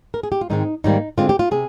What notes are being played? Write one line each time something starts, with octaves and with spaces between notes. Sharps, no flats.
A#4
G#4
G4
F4
G#2 D#3 G#3 C4 D#4
G#2 D#3 G3 A#3 D#4
D3 G#3 C4 F4
G4
F4
C3 G#4